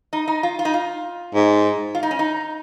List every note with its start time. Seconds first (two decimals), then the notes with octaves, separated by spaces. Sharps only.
0.13 D#4
0.28 D#4
0.43 F4
0.59 F4
0.65 D#4
0.74 F4
1.35 G#2
1.95 F4
2.03 D#4
2.11 C#4
2.19 D#4